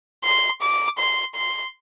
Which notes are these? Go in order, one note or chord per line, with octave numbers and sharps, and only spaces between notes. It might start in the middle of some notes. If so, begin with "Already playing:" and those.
C6
D6
C6
C6